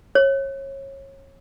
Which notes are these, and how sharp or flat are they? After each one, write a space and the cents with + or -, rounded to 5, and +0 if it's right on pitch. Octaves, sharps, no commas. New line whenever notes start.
C#5 -25